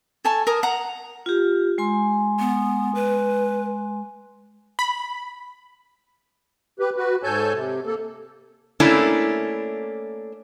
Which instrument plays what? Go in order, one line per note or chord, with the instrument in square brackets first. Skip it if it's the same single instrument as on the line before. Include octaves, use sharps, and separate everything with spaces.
[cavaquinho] A4 C#5 G#5 A5
A#4 D#6
F#5 A#5
[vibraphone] F4 G4
G#3 G#5 C6
[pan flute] B3
B4
[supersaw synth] B5
[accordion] G4 B4
F#4 B4
G#2 A4 C#5 G#5 A5 G6
C3
A#3 A4
[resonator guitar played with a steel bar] A3 A#3 C#4 D4 E4